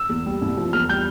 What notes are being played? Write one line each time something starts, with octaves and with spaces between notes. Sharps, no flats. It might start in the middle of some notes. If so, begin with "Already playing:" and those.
Already playing: E6
E2
G3
C2
F3
E2 F6
G3 G6